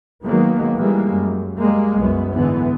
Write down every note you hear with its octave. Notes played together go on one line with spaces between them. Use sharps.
D#3 F#3 G#3 A#3 B3
E3 G3 G#3 A#3
F#2
G3 G#3 A#3
C2 F#2 B3
G#2 D3 E3 B3